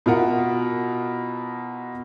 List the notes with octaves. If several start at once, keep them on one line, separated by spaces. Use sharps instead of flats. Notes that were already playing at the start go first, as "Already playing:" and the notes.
B2 E4 F4 A#4 F#5